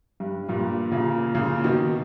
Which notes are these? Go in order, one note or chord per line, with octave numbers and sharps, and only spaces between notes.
G2
G2 A#2
A#2 C#3
A#2 C#3
B2 D#3